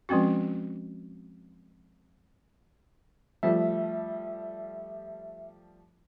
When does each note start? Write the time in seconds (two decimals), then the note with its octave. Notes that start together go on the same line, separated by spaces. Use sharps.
0.09 F3 G#3 C4 C#4 F#4
3.43 F3 G3 A3 E5